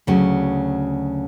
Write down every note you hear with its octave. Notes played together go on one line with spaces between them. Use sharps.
D2 C#3 F#3